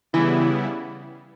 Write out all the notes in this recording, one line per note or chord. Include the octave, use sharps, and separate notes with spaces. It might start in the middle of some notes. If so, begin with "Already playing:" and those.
C#3 E3 G3 B3 E4